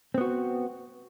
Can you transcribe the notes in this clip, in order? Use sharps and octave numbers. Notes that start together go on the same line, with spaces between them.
B3 C4 F#4